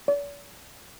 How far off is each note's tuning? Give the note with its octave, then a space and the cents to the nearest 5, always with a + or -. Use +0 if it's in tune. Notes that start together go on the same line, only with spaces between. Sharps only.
D5 -45